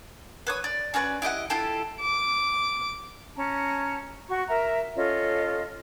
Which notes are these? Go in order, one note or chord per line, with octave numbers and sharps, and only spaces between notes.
B4 C#5 D#6
D5
C#4 F#4 B4 D5
E4 G4 D#5 F#5
E4 F4 G4 A4
D6
C#4 A5 A#5
F#4 C#6
A#4 E5 A#5
C#4 F4 A4 D#5